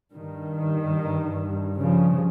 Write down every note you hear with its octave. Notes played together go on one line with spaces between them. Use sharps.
G2 D#3
C#3 F3